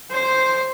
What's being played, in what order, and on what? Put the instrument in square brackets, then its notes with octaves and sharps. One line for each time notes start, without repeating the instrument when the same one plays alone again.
[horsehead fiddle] C5